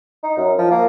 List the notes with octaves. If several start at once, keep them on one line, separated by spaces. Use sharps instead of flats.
D#4
F#2
F3
A#3